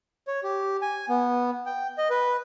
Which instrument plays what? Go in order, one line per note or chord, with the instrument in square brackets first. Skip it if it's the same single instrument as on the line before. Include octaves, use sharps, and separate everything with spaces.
[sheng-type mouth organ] C#5
G4
G#5
B3
G5
D#5
B4